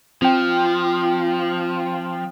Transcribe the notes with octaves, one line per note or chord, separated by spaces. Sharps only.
F3 C4 G5